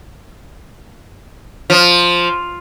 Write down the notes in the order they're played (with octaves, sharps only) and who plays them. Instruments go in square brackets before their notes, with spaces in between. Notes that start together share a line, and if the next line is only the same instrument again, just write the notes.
[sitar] F3